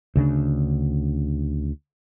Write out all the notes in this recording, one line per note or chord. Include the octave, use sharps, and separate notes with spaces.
D2 C#3 G#3 D4